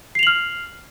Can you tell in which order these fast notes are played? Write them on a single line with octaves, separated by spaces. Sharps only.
C7 F7 F#7 F6